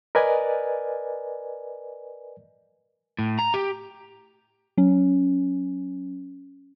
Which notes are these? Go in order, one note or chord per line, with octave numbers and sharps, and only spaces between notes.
A#4 B4 D5 D#5 G#5
A2
A#5
G4
F#3 C#4